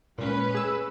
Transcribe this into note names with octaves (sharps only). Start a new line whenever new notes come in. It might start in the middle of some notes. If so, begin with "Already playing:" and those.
A#2 G#3 C#4 B4
G#4 E6